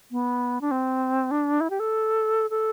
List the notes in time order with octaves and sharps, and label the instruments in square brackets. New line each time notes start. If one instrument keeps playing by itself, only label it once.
[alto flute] B3
D4
C4
D4
E4
G4
A4
A4